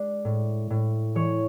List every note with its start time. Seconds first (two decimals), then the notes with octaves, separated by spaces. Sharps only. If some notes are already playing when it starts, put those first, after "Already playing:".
Already playing: G#3 D4
0.25 A2
0.70 A2
1.15 E3 C#5